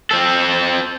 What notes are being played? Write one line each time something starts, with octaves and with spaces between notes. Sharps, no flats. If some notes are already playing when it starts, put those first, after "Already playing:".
C4 A4